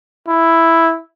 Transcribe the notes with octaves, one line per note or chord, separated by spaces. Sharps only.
E4